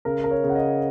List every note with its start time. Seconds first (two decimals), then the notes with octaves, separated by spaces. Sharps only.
0.05 C#3 A#4
0.24 A#4
0.31 C#5
0.44 C#3
0.49 F#5
0.55 D#5